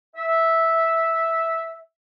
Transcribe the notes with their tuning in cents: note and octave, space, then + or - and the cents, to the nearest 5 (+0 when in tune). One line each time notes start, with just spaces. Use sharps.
E5 -10